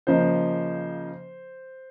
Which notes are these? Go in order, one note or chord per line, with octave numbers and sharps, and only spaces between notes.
C#3 F3 A#3 D#4 C5